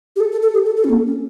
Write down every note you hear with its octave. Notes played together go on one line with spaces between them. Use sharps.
G4
A4
A4
A4
G4
A4
A4
C#4
A#3
C#4